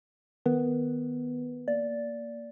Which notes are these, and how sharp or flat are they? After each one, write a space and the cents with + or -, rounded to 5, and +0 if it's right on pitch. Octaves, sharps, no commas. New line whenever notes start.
D#3 +0 B3 +0 B4 +0
A#3 +0 D5 -10